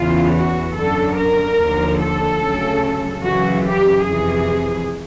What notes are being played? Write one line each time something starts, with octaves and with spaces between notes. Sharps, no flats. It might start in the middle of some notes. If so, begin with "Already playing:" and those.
Already playing: E2 C#3 E3 F4
F#4
F#2 D3 F#3 A4
A#4
D#2 D3 F3
A4
D2 C#3 F#3
F#2 C#3 E3 F#4
G4
F2 C3 E3 G#4